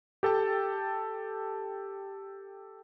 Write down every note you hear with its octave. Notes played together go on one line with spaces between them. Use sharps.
G4 A4 G5 A5